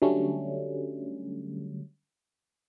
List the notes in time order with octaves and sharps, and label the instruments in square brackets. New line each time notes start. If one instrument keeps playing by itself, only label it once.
[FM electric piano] D3 F#3 G3 A3 C#4